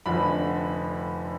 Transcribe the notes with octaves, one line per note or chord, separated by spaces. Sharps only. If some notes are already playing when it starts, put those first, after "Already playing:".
F1 F2 D3 B5